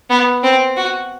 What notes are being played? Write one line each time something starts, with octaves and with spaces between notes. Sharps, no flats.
B3
C4
F#4